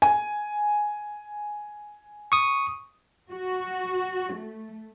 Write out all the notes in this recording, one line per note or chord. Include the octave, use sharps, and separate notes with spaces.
G#5
C#6 D#6
F#4
A3